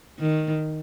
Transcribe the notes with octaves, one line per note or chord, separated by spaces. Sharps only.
D#3